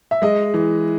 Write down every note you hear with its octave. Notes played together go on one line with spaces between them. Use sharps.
E5
G#3 D#5
E3